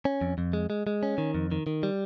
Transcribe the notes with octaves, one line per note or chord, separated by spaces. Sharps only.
C#4
F2
F2
G#3
G#3
G#3
C#4
D#3
F2
D#3
D#3
G3